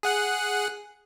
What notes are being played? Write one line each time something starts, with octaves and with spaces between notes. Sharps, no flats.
G#4 F#5 F#6